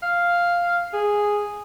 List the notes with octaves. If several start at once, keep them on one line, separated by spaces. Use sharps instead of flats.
F5
G#4